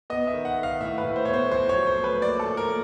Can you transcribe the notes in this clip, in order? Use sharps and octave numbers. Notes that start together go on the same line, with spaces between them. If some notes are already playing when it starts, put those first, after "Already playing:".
B3 D#5
E5
D#3
F#5
D#3
F5
A2 E5
B4
A2
C5
B3 C#5
C5
F2 C5
C#5
F#3
C5
A3
B4
A#3 D5
A4
F3
A#4
A#3